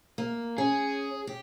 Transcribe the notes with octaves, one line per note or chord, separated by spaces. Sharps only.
A#3
C#4 G#4
G4